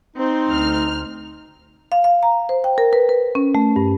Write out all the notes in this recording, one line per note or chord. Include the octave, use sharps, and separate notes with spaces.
C4 D#4 C5
D2 F6
F5
F5
A#5
C5
G5
A#4
B4
B4
C#4
A3
G2